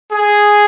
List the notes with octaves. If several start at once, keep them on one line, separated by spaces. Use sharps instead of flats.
G#4